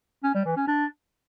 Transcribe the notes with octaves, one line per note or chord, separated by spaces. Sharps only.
C#4
G3
E3
C#4
D4